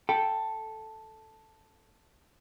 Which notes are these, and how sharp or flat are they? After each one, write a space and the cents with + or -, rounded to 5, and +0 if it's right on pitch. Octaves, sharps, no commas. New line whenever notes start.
A4 +0 G5 +0 B5 +0